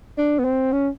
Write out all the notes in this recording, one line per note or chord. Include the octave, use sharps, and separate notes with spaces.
D4
B3
C4
C#4